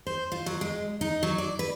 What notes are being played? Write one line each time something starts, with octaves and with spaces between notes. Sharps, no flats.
C5
F4
F#3
G#3
D#4
F#3
D5
B4